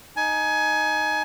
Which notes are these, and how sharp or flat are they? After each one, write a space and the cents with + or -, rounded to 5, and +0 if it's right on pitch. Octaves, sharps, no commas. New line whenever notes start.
D#4 +0 G#5 +25